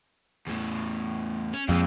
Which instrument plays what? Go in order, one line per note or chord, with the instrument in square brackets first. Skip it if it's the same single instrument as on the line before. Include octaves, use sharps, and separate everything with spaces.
[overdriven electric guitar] E2 A2
C#4
[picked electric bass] F2 [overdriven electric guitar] A#2 G#3